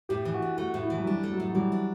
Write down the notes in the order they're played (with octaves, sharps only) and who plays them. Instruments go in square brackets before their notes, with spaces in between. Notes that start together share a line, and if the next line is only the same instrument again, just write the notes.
[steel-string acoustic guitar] A2 [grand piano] G4
[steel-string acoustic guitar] E3
[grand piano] F#4
[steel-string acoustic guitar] D4
[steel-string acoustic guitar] A3 [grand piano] F#4
[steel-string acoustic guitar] A2 [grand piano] F#4
[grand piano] E4
[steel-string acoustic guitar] E3
[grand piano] F#3
[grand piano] G3 [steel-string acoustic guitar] D4
[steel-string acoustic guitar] A3
[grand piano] F#3
[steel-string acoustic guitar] A2
[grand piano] F#3
[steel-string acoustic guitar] E3 [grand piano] G3
[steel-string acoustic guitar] D4